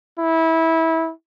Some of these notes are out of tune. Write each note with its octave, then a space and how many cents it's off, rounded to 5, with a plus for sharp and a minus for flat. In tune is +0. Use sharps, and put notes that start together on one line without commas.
E4 -20